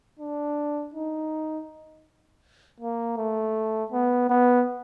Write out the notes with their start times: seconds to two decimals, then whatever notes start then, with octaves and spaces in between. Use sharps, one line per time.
0.19 D4
0.94 D#4
2.80 A#3
3.17 A3
3.92 B3
4.29 B3